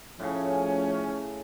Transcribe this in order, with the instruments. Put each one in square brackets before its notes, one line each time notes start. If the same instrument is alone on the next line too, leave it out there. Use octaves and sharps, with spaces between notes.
[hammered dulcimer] A2 C#3 [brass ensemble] F3 A3 C#4